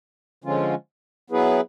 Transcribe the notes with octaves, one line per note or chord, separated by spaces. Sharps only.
D3 F3 G#3 C#4 F4
F#3 B3 E4 G#4 B4